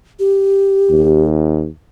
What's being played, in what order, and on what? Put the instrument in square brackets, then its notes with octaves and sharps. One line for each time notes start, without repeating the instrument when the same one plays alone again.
[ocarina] G4
[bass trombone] D#2